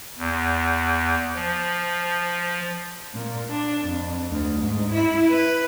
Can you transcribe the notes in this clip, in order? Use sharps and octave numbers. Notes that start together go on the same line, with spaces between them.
E2
F3
A#2
D4
F2
D2
G#2
E4
B4